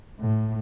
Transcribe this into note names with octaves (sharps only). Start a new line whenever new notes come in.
A2